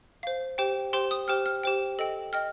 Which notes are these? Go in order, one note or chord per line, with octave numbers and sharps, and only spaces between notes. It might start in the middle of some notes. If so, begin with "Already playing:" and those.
C5 F5
G4 C5 G5
G4 C5 G5 C6
D#6
G4 C5 G5 F6
F6
G4 C5 G5
A4 D#5 G5
D#5 G5 F6